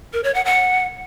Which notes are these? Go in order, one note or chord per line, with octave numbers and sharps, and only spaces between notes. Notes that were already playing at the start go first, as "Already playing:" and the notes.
A#4
C#5
F#5
F#5